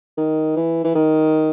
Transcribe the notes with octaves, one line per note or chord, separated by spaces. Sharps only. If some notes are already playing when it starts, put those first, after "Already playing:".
D#3
E3
E3
D#3